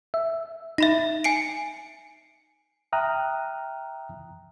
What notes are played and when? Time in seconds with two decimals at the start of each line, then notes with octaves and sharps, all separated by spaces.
0.14 E5
0.78 D#4 E5 B5 A#6
1.24 G#5 C7 D7
2.92 E5 G5 A#5 D#6 F6 F#6